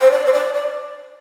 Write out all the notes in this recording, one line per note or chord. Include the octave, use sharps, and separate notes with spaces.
C5
D5
C5
D5
D5